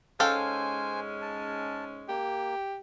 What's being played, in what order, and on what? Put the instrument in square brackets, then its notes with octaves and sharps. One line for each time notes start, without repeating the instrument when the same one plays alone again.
[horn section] G#2 G#3 C#4 [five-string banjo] A4 F5 G5 [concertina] C5 G#5
[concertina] A5
[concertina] A#3 [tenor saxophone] G4